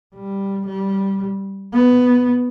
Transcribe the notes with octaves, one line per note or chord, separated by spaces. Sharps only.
G3
G3
B3